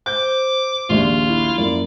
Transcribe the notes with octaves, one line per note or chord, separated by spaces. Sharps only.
C5 D6 G6
A#1 D#2 F4 D5
E4
F#2 A#3 D5